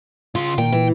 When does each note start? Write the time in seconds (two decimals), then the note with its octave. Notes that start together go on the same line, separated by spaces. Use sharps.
0.35 C#3 F4 C6
0.58 A#2 D#3 G5
0.72 E3